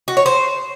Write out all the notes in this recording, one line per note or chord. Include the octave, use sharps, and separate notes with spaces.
F#4
C#5
C5